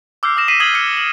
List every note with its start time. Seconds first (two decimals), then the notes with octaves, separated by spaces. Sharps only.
0.23 D6 E6 F6 G6 C7
0.36 D6 D#6 F6 A#6 E7
0.48 D6 B6 C7 D#7 F#7
0.60 D#6 G#6 C7 F#7 G7
0.74 F6 G6 C#7
0.97 F#7